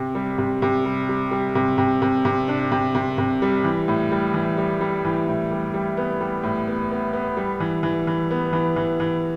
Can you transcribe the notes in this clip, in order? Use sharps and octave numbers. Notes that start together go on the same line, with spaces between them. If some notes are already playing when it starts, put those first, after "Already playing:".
Already playing: C3
G3
C3
C3
G3
G3
G3
C3
C3
C3
C3
D4
C3
C3
C3
G3
E3
A2
G3
E3
G3
G3
E3
A2
G3
G3
B3
G3
A2
B3
B3
B3
G3
E3
E3
E3
B3
E3
E3
E3